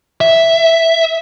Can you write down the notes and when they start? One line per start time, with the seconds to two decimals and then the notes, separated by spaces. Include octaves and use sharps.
0.21 E5